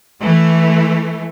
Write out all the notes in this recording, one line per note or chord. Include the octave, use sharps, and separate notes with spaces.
E3 A3